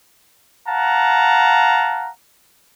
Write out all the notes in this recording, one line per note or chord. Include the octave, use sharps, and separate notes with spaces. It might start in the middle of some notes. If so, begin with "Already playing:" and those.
F5 F#5 A5 A#5